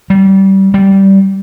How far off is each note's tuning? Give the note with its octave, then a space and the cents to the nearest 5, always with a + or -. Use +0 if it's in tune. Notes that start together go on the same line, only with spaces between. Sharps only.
G3 -25
G3 -15